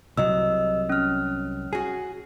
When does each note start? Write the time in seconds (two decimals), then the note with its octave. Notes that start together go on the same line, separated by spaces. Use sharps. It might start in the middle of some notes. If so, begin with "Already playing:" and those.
0.17 C2 F#3 D#5 E6
0.89 C#4 F6
1.73 F#4 G#4